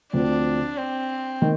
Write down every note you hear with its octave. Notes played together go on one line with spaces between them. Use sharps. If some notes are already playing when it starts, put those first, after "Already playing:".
D2 D3 F3 C4 D4
C4
D#3 A#3